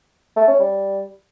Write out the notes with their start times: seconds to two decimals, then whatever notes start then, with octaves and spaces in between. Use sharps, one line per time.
0.36 A3
0.48 C#4
0.60 G3